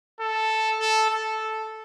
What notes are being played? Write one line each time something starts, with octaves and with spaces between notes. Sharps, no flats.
A4
A4
A4